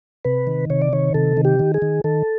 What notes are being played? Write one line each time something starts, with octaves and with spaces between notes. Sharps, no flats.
C3 B4
D#3
C3 C#5
D5
D#3 C#5
C3 A4
D#3
G4
D#3
G#4
D#3
D#3 A4